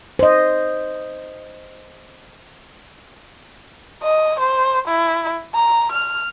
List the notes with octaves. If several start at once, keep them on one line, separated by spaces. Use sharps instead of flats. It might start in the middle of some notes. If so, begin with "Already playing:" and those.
C5 D#5
D#5
C5
E4
A#5
F6